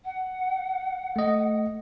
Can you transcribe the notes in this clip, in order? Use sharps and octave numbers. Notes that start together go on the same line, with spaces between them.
F#5
A3 D#5